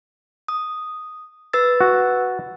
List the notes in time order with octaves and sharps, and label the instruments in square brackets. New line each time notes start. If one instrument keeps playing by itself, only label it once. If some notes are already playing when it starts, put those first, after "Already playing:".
[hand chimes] D#6
B4 E6 A6
[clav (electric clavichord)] F#4